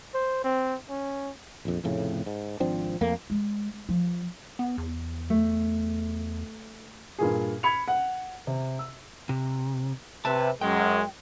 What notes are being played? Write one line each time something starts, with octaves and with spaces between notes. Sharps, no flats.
C5
C4
C#4
A#1 F2
F1 F2 A2 C#3
G#2
G#1 F3 C4 D4
F2 A3 A#3
G#3
F3
B3
E2
A3
G2 A#2 G#4
B5 G#6 C#7 F7
F#5
C3
E6
C3
C3 B4 E5 A5
F#2 G#3 G5